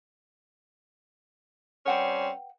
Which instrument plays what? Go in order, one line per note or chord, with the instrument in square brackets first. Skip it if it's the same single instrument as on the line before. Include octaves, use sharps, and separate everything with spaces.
[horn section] G3 C4 C#4 [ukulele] B4 F#5 G5